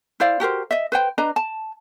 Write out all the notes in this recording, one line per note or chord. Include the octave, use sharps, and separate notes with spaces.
E4 C5 D5 F5
F#4 G4 A#4 C5
D#5 E5
B4 C5 G5
D4 B4 D#5 A#5
A5